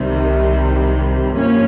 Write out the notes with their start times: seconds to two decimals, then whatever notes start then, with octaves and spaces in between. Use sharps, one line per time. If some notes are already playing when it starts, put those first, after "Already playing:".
Already playing: C2 C3 D#3 G3
1.35 G2 F3 A#3 C#4